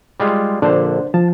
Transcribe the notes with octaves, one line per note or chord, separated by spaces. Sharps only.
G3 G#3 F4
A#1 D3 D4 C5
F3 A5